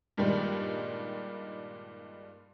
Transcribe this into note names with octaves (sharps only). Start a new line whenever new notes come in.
G2 A#2 D#3 G3 G#3